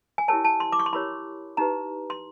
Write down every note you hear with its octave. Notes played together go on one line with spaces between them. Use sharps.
G#5
E4 G4 A#4 C#5 A5
A5
C6
D6
C#6
C6
E4 G4 A#4 C#5 B5
D#4 G4 B4 A#5
C6